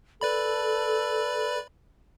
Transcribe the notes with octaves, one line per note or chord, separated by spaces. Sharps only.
A4 B4 D5 B5